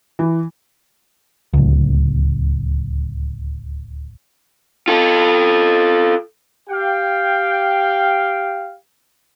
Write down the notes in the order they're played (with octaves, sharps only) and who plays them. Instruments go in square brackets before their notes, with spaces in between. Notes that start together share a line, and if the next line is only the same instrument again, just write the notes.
[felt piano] E3
[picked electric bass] D1 C#2
[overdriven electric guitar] F4 A4
[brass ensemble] G4 F5 G5